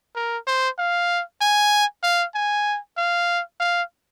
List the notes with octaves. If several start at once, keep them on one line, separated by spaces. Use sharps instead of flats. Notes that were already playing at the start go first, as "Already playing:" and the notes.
A#4
C5
F5
G#5
F5
G#5
F5
F5